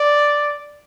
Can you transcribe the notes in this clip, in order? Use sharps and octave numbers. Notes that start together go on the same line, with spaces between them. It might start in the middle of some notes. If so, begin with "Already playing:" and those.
Already playing: D5